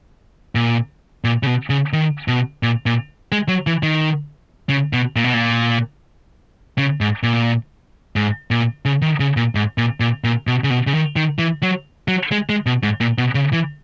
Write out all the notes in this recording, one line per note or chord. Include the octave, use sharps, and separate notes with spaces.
A#2
A#2
C#3
B2
C#3
D#3
B2
A#2
A#2
G#3
F#3
E3
D#3
C#3
B2
A#2
B2
A#2
C#3
G#2
A#2
G#2
A#2
C#3
D#3
C#3
A#2
G#2
A#2
A#2
A#2
B2
C#3
B2
C#3
D#3
D#3
E3
F#3
F#3
G#3
G#3
B2
G#2
A#2
B2
C#3
E3